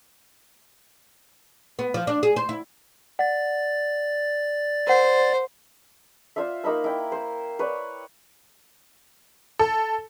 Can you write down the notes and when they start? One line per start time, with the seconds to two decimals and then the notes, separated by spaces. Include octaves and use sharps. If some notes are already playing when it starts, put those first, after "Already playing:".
1.79 B3
1.94 F3
2.07 D4
2.23 G#4
2.36 C5
2.49 E4
3.19 D5 F#5 A6
4.87 A#4 C5 F#5
6.36 F4 C5 D5 E5
6.64 A#3 D#4 B5 E6
6.84 E4 G5
7.12 C5
7.59 B4 C#5 D5
9.59 A4